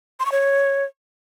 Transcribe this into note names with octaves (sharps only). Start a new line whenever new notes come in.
C6
C#6
C#5